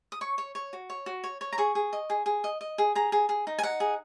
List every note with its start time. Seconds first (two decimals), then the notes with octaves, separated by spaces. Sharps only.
0.12 D#6
0.21 C#5 C#6
0.38 C#5
0.55 C#5
0.73 F#4
0.90 C#5
1.06 F#4
1.24 C#5
1.41 C#5
1.53 A#5
1.58 G#4 C#6
1.75 G#4
1.93 D#5
2.10 G#4
2.26 G#4
2.44 D#5
2.61 D#5
2.78 G#4
2.95 G#4 A#5
3.12 G#4
3.29 G#4
3.47 D#4
3.59 G#5
3.63 D#4 F#5
3.80 G#4